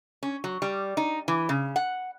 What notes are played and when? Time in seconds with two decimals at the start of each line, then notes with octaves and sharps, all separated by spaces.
0.23 C#4
0.44 F#3
0.62 G3
0.97 D#4
1.28 E3
1.49 C#3
1.76 F#5